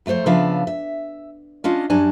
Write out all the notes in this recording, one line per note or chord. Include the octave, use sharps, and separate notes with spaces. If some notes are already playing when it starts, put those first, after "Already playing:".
F2 A3 F4 C5 C#5
C#3 F3 B3 D4 E5 F5
E5
C#4 D4 F4 D#5
F#2 F#3 G3 D4 G#5